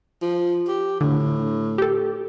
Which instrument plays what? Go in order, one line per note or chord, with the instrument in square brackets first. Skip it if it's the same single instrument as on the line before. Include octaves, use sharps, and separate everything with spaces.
[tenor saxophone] F3
G4
[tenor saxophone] A2 [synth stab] D3
[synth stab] G4 A4